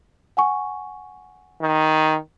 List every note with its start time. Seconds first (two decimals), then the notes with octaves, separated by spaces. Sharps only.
0.37 F#5 G#5 C#6
1.62 D#3